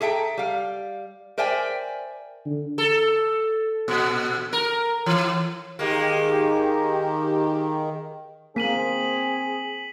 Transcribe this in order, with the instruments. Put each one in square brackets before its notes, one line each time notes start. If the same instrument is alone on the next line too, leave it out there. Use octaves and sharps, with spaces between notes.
[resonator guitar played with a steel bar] G#4 A4 E5 G5 A#5
G3 F5
A#4 C5 D5 E5 G5 G#5
[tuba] D3
[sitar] A4
A#2
A#4
E3
[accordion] D#3 [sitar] G#3 A#3 [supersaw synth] G4
[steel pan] A#3 [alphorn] C4 [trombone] G#4 [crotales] B6 D#7 F#7